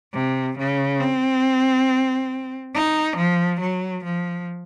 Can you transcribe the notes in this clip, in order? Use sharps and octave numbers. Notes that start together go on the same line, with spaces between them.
C3
C#3
C4
D#4
F3
F#3
F3